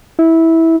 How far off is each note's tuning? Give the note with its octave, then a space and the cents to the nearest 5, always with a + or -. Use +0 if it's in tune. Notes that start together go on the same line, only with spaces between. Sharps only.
E4 -15